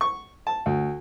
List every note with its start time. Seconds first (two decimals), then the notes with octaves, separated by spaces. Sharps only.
0.01 C#6
0.47 A5
0.66 D2